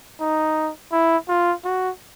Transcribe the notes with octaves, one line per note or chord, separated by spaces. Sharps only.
D#4
E4
F4
F#4